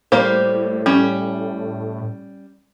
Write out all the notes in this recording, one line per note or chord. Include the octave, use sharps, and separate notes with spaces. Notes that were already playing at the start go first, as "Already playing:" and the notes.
A2 G3 A#3 C5
G3 C#4